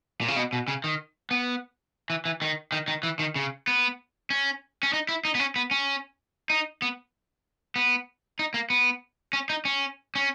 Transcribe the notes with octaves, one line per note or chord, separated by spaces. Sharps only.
A#2
C#3
B2
B2
C#3
D#3
B3
E3
E3
D#3
D#3
D#3
E3
D#3
C#3
B3
C#4
C#4
D#4
E4
D#4
B3
C#4
B3
C#4
D#4
B3
B3
D#4
A#3
B3
C#4
D#4
C#4
C#4